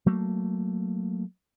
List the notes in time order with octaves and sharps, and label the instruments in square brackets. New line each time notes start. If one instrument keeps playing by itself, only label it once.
[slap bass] F#3 A3 A#3